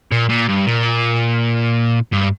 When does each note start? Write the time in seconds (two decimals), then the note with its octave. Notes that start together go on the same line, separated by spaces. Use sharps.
0.12 A#2
0.30 A#2
0.49 G2
0.67 A#2
2.13 G2